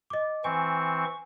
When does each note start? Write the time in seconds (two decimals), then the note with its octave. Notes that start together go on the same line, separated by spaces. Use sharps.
0.10 D#5 D6
0.44 E3 C4 G#5 C#6